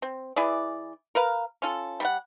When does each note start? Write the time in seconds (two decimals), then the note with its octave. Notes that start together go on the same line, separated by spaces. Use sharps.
0.02 C4
0.36 E3 E4 G#4 D5
1.15 A#4 B4 F5
1.62 C#4 F4 A4
2.00 G3 A#4 F#5